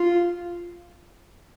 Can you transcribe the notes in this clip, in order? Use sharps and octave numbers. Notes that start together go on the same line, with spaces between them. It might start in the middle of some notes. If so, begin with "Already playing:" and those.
Already playing: F4